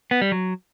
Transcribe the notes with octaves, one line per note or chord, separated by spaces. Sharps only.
B3
G3
F#3